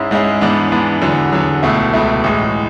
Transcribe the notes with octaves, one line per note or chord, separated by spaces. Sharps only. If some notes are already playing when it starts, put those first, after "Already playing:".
Already playing: G#2 G#3 C#4 E4
G#2 G#3 C#4 E4
G#2 E3 B3 D4
G#2 E3 B3 D4
E2 D3 F#3
E2 D3 F#3
C#2 B2 A3 E4
C#2 B2 A3 E4
A1 A2 G#3